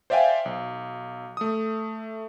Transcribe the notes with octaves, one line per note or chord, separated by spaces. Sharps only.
C5 D5 E5 F5 G5 G#5
B1
A3 D#6